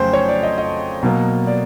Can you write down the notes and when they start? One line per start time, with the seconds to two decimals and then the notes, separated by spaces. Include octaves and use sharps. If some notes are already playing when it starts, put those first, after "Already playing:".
Already playing: F2 C#3 F#3 A3 C5 G5 G#5
0.13 C#5
0.28 D5
0.43 D#5
0.58 D#5
1.03 B2 F#3 A#3
1.47 D5